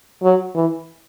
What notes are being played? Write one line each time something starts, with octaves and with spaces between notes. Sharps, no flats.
F#3
E3